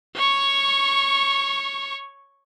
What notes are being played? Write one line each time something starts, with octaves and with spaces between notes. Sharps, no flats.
C#5 C#6